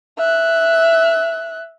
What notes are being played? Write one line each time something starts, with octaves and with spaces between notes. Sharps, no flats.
E5 F#6